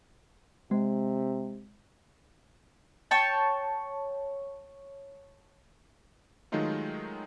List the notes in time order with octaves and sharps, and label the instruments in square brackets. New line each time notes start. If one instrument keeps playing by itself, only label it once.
[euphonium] C3 [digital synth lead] G#3
[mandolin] C#5 G5 A5
[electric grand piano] D#3 F#3 G#3 A3 D#4 F4